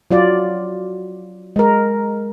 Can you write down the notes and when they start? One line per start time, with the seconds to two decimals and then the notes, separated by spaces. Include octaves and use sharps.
0.11 F#3 F4 D5
1.56 G#3 A#4